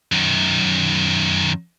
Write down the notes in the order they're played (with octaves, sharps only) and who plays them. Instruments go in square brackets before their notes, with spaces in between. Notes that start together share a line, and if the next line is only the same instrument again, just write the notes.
[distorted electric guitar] F#2 D#3